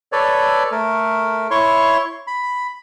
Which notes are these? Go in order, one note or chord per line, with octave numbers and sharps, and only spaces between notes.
A4 B4 C#5 D5
A3 A#4
E4 C#5 C6 C#6
B5